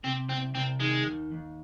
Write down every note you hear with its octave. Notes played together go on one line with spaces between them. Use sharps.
C3 C4
C2 C4
C2 C4
D#3 G#3
D#2
D#2